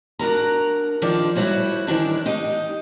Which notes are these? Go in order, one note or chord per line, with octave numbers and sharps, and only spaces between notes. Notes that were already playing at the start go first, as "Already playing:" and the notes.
D4 F#4 A#4 A#5
D#3 F3 D4 D5
G3 E4 F#4 C5 C#5
D#3 E3 D4 A5
D#4 G4 D#5